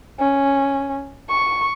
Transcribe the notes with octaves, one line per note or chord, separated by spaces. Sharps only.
C#4
C#6